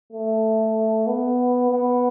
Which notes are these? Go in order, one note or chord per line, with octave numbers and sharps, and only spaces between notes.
A3
B3
B3